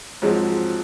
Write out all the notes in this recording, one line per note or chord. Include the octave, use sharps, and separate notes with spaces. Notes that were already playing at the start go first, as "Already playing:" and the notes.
G#2 F3 F#3 G#3 C4